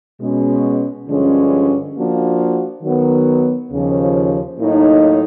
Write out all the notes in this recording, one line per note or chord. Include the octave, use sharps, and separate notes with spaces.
B2 G#3 C#4
G2 D3 F3 G#3 C#4
F3 A#3 D4 F#4
D#3 F#3 B3
D#2 C#3 F3
A2 F#3 A#3 D#4